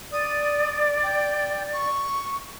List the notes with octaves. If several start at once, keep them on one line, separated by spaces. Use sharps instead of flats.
D5 D#6
G5
C#6